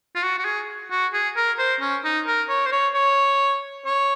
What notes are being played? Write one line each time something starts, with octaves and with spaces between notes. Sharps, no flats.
F4
F#4
F#4
G#4
F#4
G#4
A#4
C5
C#4
D#4
A#4
C#5
C5
C#5
C#5
C#5